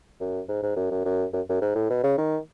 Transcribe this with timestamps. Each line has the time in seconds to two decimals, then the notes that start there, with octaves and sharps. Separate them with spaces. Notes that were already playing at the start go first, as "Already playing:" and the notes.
0.20 F#2
0.48 G#2
0.63 G#2
0.76 F#2
0.91 F#2
1.05 F#2
1.33 F#2
1.49 F#2
1.61 G#2
1.75 A2
1.90 B2
2.03 C#3
2.18 D#3